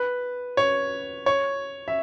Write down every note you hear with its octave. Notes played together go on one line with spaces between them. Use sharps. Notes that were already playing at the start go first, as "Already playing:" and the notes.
Already playing: B4
C#5
C#5
E5